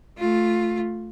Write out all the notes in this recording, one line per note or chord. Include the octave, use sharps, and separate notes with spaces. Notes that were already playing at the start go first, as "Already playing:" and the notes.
A3 F4